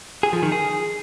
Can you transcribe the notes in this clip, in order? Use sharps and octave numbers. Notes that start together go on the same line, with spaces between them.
G#4
F3
D#3
G#4